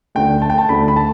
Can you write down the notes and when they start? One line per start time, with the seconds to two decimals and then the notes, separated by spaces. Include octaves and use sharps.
0.15 D2 D3 A3 G5
0.42 A5
0.50 G5
0.58 A5
0.69 D2 D3 A3 B5
0.88 B5
0.96 A5